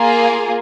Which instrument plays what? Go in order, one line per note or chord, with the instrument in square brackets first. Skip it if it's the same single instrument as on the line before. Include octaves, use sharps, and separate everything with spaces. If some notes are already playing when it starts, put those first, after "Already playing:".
Already playing: [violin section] A#3 F4 G#4